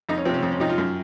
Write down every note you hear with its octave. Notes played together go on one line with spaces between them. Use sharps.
F2 D#4
C#4
C3 F3 C4
C#4
F2
C#4
C3 F3 D#4
F4
F#2